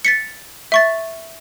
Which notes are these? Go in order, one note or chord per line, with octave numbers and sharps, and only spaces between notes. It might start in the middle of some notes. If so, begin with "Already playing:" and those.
A6 B6 C#7
E5 C#6 A6